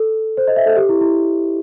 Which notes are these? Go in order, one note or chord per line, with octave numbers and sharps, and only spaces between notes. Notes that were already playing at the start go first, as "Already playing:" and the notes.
Already playing: A4
C5
D#5
E5
A4
G4
E4
E4